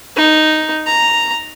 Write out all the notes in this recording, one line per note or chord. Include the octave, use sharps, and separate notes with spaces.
D#4
A#5